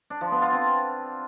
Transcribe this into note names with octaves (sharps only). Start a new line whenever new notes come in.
D4
F3
B3
F4
C4